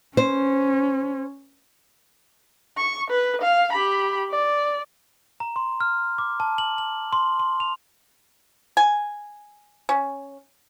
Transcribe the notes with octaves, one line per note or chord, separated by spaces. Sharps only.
C#4 C5
C#6
B4
F5
G4 B5
D5
A#5
C6
F6
D6
A5
F#7
F#7
C6
C6
F7
G#5
C#4